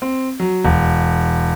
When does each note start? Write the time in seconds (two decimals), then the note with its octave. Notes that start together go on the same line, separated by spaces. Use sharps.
0.02 C4
0.40 F#3
0.64 E1